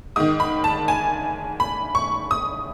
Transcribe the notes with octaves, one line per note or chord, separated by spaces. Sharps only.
G#2 D#3 D#6
B5
A5
G#5
B5
C#6
D#6